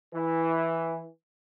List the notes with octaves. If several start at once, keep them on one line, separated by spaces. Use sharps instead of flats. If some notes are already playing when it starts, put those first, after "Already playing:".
E3